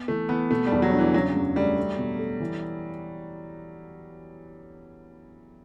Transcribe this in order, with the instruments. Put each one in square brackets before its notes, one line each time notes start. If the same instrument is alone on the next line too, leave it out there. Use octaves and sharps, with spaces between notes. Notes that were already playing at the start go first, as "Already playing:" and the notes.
Already playing: [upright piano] B3
[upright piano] E3 [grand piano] A3
[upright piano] E3 [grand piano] B3
[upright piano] B2 [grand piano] A3
[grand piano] G3
[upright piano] E2
[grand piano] F#3
[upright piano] D4
[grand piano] E3
[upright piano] C#3 [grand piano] F#3
[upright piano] F#2
[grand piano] G3 [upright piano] A3
[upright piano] A3
B2
A4
E3